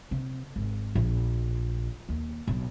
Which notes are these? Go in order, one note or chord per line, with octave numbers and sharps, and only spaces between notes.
C3
G#1
A#1
D#2
B1